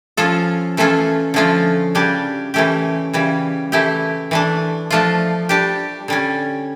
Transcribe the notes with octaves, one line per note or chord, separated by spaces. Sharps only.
F3 C#4 F4 A4
E3 A3 C#4 F4 A4
D3 F3 A3 C#4 F4
C#3 G3 D4 G4
E3 A3 C#4 G4
C#3 E3 G3
E3 A3 E4 G4
E3 A3 D4
F3 A3 D4 F4
G3 D4 G4
D3 G3 C#4